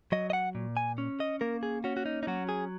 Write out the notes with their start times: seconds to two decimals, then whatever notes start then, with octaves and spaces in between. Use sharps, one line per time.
0.12 F#3 D#5
0.30 D#5
0.33 F#5
0.55 A#2
0.77 G#5
0.98 C#4
1.20 D#5
1.41 A#3 A#4
1.63 G#4
1.84 C#4 F#4
1.97 F#4
2.06 D#4
2.23 D#4
2.27 F#3 F#4
2.49 G#4